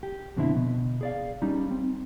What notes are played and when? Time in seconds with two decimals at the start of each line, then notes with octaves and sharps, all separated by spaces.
0.03 G4
0.37 F2 B2 D3 C4 E4
0.56 B2
1.01 G#4 D5 F5
1.42 G3 C#4 D#4
1.71 C4